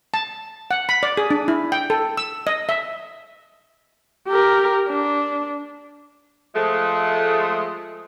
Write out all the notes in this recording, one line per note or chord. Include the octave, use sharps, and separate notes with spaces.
A5
F#5
B5
D5
G#4
D4
E4
G5
A4
E6
D#5
E5
G4 A#4
D4
F3 G#3 A3